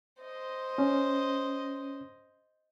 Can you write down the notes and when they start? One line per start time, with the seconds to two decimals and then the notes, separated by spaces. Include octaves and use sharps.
0.22 C5 D#5
0.78 C#4